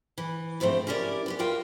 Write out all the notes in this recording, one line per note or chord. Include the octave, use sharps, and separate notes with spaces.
E3
D2 G#2 F3 A3 C4
C#4 E4 G4 A#4 C5 D5
B3 F4 G4
F4 F#4 A#4 F5 G5